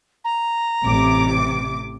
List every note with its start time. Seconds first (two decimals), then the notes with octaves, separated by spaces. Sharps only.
0.25 A#5
0.85 A1 C3 D6